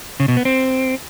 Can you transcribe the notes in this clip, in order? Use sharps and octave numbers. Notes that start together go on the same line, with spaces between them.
C#3
B2
B3
C4